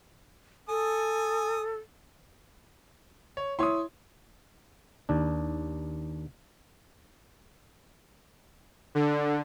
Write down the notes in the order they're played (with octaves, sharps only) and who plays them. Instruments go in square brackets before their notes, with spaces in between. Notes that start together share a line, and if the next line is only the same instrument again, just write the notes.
[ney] A4 [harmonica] G#5 D#6
[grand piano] C#5
[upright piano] E4 C#5 [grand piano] C6 D#6
[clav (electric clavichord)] D#2 D4
[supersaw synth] D3